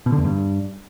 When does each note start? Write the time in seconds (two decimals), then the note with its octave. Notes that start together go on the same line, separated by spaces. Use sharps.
0.06 B2
0.12 D3
0.18 E2
0.24 G2